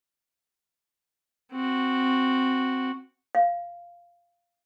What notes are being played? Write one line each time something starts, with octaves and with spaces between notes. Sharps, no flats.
C4 F#4
F5